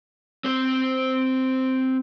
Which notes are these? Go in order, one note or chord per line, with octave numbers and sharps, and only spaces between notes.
C4 C5